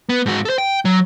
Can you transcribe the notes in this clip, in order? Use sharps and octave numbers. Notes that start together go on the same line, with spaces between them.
B3
G#2 F#4
A4 C5
G5
F#3